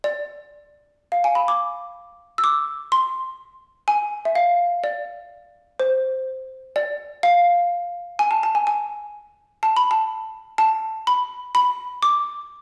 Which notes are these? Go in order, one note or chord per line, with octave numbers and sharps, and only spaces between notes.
D5
F5
G#5
B5
D6
E6
D6
C6
G#5
E5
F5
D5
C5
D5
F5
G#5
A5
A5
G#5
G#5
A5
B5
A5
A5
B5
B5
D6